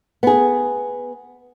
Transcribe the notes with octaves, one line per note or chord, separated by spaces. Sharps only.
B3 G#4